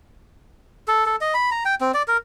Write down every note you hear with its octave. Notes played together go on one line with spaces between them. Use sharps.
A4
A4
D#5
B5
A#5
G5
C4
D5
A#4